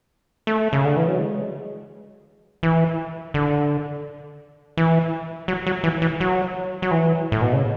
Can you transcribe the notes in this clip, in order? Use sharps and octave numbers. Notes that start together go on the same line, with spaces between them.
A3
C#3
D3
E3
F#3
G#3
E3
D3
E3
F#3
F#3
E3
E3
F#3
F#3
E3
A2
B2
C#3